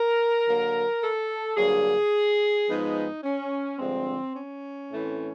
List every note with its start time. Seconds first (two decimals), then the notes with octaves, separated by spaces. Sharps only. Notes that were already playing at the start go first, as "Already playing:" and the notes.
Already playing: A#4
0.45 D3 F#3 A#3
1.01 A4
1.56 G2 D3 F#3 A#3 G#4
2.67 G#2 F3 G#3 B3 D#4
3.24 C#4
3.79 G2 D3 F3 G#3 C4
4.35 C#4
4.91 A2 E3 A3 C4